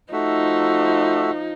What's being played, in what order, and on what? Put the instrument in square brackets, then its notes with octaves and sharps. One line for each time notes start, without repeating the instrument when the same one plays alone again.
[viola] F3 D#4 [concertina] A3 F#4 E5